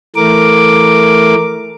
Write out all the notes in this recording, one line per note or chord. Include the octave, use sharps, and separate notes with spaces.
E3 A3 A#4 D6